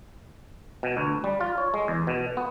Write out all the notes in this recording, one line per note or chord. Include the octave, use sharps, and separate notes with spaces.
B2
D2
G3
F4
C#5
G#3
E2
B2
B3